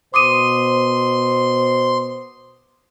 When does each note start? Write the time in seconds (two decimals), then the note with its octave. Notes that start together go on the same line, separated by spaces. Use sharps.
0.14 B2 C5 C6 D6 D#6 D#7